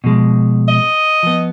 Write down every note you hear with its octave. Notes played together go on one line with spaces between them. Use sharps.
B2 F3 G#3
D#5
F3 B3